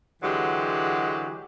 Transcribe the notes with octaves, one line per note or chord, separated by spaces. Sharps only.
D3 E3 F#3 G#3 G4